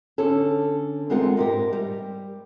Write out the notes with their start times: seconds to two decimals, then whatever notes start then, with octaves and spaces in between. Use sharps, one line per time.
0.18 D3 C#4 A4
1.10 E2 G#3 C4 F4 A#4 F#5
1.37 G#2 G4 A#4
1.73 G3